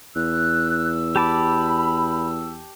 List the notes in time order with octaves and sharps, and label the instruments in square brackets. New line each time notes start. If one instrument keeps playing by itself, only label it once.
[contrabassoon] E2 [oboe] E6 [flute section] F#6
[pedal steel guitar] G4 A5 D6 [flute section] B5